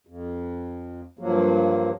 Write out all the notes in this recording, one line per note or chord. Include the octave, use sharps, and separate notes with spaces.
F2
G2 F3 F#3 A#3